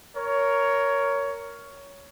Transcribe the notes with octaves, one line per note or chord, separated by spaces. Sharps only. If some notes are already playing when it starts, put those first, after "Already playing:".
A#4 C#5